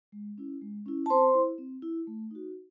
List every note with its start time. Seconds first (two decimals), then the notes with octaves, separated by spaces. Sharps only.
0.12 G#3
0.38 C#4 E4
0.61 G#3
0.86 C#4 E4
1.06 A5
1.10 C4 C5 C6
1.34 E4
1.58 C4
1.82 E4
2.07 A3
2.31 D#4 F#4